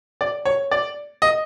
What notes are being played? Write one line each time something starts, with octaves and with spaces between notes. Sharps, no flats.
D5
C#5
D5
D#5